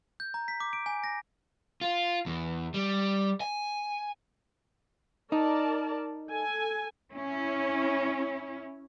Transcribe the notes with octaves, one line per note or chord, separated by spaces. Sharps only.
G6
A#5
B6
D6
D7
G#5
A#6
F4
E2
G3
G#5
D#4 A#4 D5 A5
A4 G#5
C#4 E4